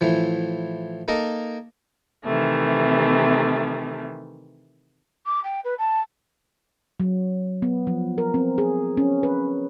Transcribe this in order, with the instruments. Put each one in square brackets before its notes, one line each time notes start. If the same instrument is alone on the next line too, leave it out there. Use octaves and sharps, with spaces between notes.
[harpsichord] A2 E3 F3
A#3 D#4 A4 A#4 D#5
[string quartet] C3 D#3 E3 A3
[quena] D6
G5
B4
A5
[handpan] F#3
B3
F3
A#4
C4
G#4
C#4
B4